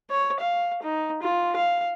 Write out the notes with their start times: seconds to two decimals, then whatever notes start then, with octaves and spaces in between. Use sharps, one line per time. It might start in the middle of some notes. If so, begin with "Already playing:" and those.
0.11 C#5
0.40 F5
0.83 D#4
1.22 F4
1.56 F5